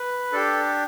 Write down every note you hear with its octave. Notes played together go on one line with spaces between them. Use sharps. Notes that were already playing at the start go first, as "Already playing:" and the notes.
Already playing: B4
D4 G4 A4